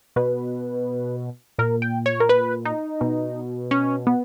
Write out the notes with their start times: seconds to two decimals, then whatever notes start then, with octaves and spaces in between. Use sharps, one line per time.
0.16 B2 B4
1.58 A#2 A#4
1.82 G5
2.06 C#5
2.20 A#4
2.29 B4
2.65 D#4
3.01 B2
3.71 C#4
4.07 B3